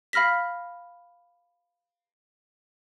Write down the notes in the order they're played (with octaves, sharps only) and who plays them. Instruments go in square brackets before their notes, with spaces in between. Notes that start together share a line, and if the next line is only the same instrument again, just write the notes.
[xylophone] F5 B5 F6 A#6 B6